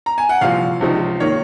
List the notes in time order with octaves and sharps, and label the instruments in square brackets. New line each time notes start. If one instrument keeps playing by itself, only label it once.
[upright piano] A#5
G#5
F#5
[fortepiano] C2 A#2 F3 [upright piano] F5
[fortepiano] C#2 C3 F3 C4 D#4
[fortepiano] D#3 A#3 [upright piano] C#5